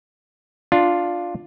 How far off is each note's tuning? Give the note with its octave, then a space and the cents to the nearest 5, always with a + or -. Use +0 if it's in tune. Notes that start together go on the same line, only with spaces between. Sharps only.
D4 +0 F4 +0